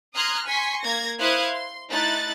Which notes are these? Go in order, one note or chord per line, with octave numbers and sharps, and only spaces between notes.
A#5 C6 D#6 F6 F#6 G#6
G#5 C6 C#6 B6
A#3 G#6 A#6
E4 C5 F5 D#6 F#6 G#6
C6
A3 D#4 E4 F#6 A6